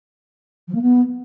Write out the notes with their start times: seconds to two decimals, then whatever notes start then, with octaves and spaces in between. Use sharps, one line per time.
0.68 F3
0.74 A#3
0.81 B3